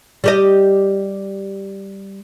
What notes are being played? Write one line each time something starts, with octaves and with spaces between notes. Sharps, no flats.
G3 G4 D#5